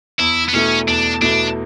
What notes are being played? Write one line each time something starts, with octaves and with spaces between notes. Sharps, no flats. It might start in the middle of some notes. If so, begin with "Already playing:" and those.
E2 E4
B3
B2 A3 C#4 E4
E2 D4
B2 A3 D4 E4